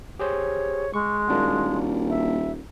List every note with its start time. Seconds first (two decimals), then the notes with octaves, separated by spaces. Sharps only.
0.19 G4 G#4 C5 C#5
0.94 G#3 C#6
1.28 D#1 A#3 D4 F#4
2.10 E5